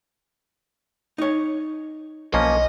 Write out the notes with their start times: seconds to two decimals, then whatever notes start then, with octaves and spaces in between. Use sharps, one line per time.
1.18 D#4 C#5
2.34 B1 F3 A#3 C#4 D#5